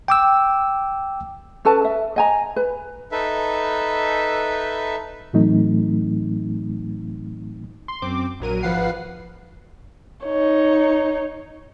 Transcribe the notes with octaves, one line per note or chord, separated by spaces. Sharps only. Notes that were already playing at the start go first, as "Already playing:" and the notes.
G5 D6 E6
C#4 A4 B4 A5
E5
D#5 G#5 A#5
B4
D#4 A4 B4 E5
A2 E3 F#3 A3 C4 D#4
C6
F#2 C4 D6
A#1 F#3 A#4 D#7
G#1 F3 B4 F5 F#5 C7
D#4 C#5